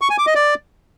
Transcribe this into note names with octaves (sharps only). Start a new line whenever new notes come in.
C#6
G#5
D6
D#5
D5